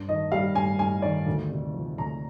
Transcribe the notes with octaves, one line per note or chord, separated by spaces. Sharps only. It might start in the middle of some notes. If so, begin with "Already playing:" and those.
Already playing: G2
D#3 D#5
G3 F5
G2 G#5
G2 G#5
D#3 D5
D2
C3
F3
D2 A#5